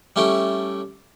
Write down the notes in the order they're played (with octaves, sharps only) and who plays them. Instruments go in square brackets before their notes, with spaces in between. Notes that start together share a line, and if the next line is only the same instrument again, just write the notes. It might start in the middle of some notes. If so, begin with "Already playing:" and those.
[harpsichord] G3 A3 C#4 E4 G5